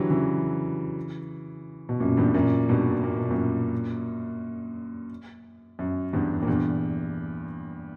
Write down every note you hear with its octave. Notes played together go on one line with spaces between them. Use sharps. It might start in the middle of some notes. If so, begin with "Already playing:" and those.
Already playing: D3 E3 F#3 G3
C#3 E3
B2
F#2 A#2
E2 G2
F#2 A#2
G2 B2
A#2
B2
F#2 A#2
F#2
E2 G2
A#2
E2 G2